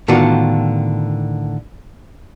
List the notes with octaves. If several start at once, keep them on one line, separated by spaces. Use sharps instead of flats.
A2 D3 D#3 B3 F4 F#4